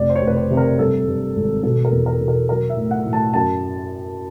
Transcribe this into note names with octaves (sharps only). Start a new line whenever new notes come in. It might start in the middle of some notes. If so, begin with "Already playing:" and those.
Already playing: F1 D5
C5
C#5
F1
B4
C5
C3
A#4
G2 A4
G2
G#1
B2 A4
A#4
E2
A#4
B2
A#4
F#3 A#4
E5
A2
F#5
A2
A5
F#2 A5